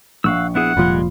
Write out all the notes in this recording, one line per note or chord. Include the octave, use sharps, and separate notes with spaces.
A#1 F5 F#5 C#6 E6
B3 E4 G#4 F#5
F1 A#2 F3 G3 G#3 B5 C6